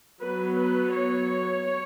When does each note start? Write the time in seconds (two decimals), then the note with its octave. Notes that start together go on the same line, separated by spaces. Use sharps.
0.21 F#3 B3 B4
0.59 B4
0.96 C#5